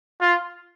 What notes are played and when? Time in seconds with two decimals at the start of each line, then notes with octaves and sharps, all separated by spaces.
0.21 F4